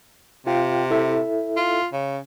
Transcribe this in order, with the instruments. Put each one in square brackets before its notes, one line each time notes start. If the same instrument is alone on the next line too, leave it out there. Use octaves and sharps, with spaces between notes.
[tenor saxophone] C3 [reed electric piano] F4 F5 G5
[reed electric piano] E4 A4 E5
[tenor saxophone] F4
C#3